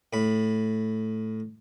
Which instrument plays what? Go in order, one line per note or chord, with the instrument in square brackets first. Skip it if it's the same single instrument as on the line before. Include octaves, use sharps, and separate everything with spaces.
[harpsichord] A2 B5